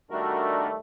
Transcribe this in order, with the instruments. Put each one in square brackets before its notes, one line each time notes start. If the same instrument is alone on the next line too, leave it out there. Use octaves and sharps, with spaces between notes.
[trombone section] D#3 G3 A3 [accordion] D4 F#4 A#4